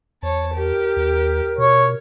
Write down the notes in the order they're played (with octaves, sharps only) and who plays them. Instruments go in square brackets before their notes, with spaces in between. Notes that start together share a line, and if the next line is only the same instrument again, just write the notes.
[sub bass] E2 [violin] C#5 A5
[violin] G4 [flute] A#4
[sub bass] D#2
[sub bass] B2 [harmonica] C#5